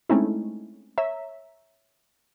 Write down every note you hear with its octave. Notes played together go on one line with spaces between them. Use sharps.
G#3 A3 C4 C#4 D#4 E4
C#5 E5 A#5